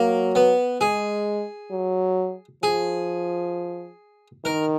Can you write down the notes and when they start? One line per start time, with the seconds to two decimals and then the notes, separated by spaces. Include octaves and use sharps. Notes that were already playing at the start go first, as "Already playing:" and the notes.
Already playing: F#3 A#3
0.35 B3
0.81 G#3 G#4
1.72 F#3
2.63 F3 G#4
4.45 D#3 A#4